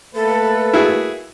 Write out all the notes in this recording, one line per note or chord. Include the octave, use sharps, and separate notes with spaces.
A3 A#3 A4 B4
E4 F#4 G#4